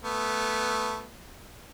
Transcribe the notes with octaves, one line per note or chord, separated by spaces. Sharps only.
A3 B3